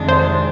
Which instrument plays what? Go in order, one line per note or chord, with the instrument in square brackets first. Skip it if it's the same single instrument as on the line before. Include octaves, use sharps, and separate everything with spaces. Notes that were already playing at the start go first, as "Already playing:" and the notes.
Already playing: [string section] F2 C3 D#3 G#3 D4
[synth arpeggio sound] C5